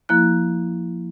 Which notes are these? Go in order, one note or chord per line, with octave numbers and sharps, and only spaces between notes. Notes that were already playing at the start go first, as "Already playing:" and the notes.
F3 A#3 E4 F#6